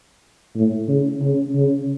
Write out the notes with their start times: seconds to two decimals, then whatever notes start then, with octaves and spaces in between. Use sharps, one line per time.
0.55 A2
0.88 C#3
1.22 C#3
1.55 C#3